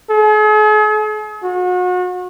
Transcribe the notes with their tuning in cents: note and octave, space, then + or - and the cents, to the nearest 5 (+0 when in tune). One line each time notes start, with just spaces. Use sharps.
G#4 +45
F#4 -35